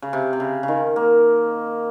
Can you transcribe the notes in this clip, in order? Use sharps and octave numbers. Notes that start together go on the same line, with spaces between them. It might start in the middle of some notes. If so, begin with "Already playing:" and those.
C#3
C3
C3
C#3
C#3
D#3
A#3